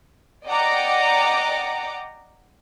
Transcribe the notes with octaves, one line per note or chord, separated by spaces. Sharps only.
D5 D#5 F#5 G5 A#5 D6